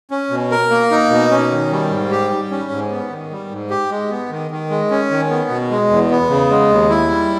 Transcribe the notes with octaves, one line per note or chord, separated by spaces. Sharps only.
C#4
B2
A#4
A#3
D#4
B2
C#4
D#3
G3
G#2
G4
G3
C#4
G#2
B3
D#3
G3
G#2
G4
G#3
B3
D#3
D#3
G#3
C#4
D#3
B3
B2
G#3
E2
B3
C#3
G#3
D#2
E4
G3